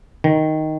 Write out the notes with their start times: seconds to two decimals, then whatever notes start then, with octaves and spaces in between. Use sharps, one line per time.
0.24 D#3